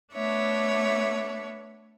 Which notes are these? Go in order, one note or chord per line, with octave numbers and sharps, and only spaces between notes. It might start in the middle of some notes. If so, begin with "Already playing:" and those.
A3 B3 D4 C#5 E5